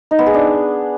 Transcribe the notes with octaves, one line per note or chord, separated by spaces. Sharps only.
D#4
B3
G#4
D4